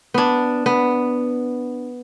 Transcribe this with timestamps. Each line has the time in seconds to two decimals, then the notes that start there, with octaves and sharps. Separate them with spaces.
0.14 B3 D4
0.66 B3